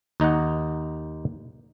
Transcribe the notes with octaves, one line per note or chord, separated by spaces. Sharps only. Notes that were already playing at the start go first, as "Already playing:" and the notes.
D#2 D#4 D#5 F#5